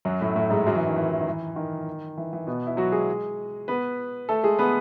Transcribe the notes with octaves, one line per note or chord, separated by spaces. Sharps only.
F#2 F#3
A2 A3
A2 A3
G#2 G#3
F#2 F#3
E3
D#3
E3
E3
D#3
E3
D#3
E3
E3
B2 B3
E4
F#3 F#4
G#3 G#4
B3 B4
A3 A4
G#3 G#4
B3 B4